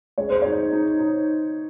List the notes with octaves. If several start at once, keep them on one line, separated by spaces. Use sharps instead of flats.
G#3 C#5
C5
D#4 C#5
D#4
D#4